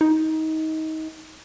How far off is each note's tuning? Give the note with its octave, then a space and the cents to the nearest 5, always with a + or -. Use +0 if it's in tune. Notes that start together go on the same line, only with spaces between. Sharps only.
D#4 +25